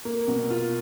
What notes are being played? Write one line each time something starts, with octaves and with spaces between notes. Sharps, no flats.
A#3
B2
F4